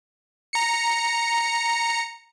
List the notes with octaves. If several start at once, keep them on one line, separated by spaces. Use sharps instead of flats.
A#5 C#7